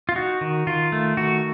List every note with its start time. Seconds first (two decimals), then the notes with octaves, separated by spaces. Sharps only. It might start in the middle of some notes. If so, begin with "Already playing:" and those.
0.09 F4
0.16 D#4 F#4
0.41 D#3
0.67 D#3 F4
0.92 A3
1.17 D#3 F#4